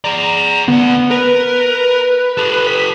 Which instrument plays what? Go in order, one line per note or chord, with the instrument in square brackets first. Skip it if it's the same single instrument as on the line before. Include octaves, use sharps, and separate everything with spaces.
[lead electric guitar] G#4 D5 [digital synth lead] A#5
[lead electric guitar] D2 F#5 [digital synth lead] B3
[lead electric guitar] A#4 [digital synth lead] B4
[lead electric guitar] G4 A4
[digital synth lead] B6